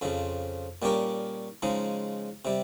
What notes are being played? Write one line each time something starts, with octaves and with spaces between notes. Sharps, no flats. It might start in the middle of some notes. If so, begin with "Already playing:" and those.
F2 C#3 F3
A#2 G3 C#4 G4 A#4
C#3 F3 G#3 D#4
C3 G3